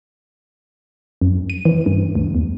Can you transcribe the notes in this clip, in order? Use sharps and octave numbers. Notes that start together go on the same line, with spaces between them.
F#2
D#7
E3
G2
D2
E2